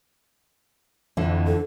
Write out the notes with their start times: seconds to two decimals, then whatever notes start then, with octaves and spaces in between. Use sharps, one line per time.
1.17 F2 D3 E3
1.47 A4